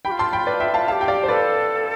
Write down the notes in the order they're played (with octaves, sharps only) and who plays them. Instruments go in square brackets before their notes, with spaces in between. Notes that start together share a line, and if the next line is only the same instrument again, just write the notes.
[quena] G4 [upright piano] G5 B5
[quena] F4
[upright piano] A5 C6
G5 B5
B4 D5
E5 G5
F5 A5
[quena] F4
[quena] G4 A4 [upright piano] F5 A5
[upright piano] G5
D5 F5
C5
[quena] A4 [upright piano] B4 D5